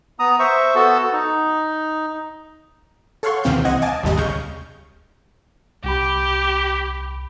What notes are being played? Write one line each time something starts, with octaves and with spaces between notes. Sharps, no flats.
B3 A#5 D#6
C5 E5 C#6
B3 F#4 A4 A5
D#4
A4 C#5 F5 F#5 C6 C#6
D#2 C3 E3 C4 F5 G6
C2 C4 D#5 F#5 G#6
D#5 F5 G#5 A5 D6
G#1 D#2 C3 G3 D#5
C#2 C#3 G#3 C#6 F6 G6
C2 G4 B5